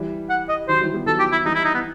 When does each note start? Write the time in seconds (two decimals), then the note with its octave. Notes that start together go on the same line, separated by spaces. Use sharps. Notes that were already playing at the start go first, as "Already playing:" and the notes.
Already playing: E3 G3
0.30 F#5
0.49 D#5
0.68 D#3 F#3 C5
0.81 E3 G3
0.93 G3 B3
1.06 D#3 F#3 A4
1.19 G4
1.32 E4
1.45 E3 G3 D#4
1.55 E4
1.65 D#4
1.74 B3